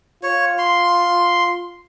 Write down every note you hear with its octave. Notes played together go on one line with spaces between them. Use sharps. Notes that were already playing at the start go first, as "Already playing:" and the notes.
F4 C#5
C6